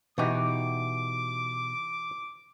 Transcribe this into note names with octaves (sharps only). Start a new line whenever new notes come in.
B2 E3 D#4 F#4 G4 D6